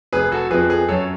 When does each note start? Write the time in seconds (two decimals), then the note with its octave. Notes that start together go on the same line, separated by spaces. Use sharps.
0.13 F1 G#4 B4
0.32 F#4 A4
0.50 F2 F3 G#4 B4
0.70 G#4 B4
0.88 F#2 A4 C#5